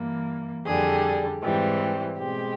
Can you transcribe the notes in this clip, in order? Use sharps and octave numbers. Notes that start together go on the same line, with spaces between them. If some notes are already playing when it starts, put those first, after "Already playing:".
Already playing: G2 E3 G3 A#3
F2 D3 G3 G#4
G#2 E3 G3 C4
B2 G#3 C4 G4